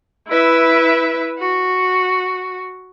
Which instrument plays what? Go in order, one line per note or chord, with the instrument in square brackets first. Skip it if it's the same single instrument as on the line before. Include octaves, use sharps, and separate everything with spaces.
[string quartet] E4 B4 E5
F#4